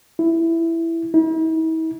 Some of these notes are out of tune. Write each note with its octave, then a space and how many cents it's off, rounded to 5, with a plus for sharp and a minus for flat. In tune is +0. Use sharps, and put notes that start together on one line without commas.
E4 +5
E4 -45